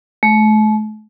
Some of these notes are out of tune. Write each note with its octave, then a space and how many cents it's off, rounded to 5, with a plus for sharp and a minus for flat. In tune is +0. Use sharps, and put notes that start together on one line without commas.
A3 -40